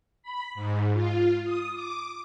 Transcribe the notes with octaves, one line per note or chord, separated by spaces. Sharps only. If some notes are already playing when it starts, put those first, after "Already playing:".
B5
G#2
F4
D#6
D6